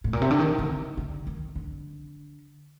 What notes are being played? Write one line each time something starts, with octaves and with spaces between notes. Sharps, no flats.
A2
A#2
C3
D3
D#3
D3
D3
D#3
D3